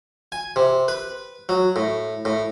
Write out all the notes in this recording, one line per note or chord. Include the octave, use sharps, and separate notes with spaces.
G#5
C3
B4
F#3
A2
A2